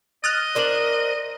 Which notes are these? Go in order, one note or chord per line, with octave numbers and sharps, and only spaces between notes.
D#5 D#6 F6 F#6 A6
D4 A#4 C5 D5 E7 F#7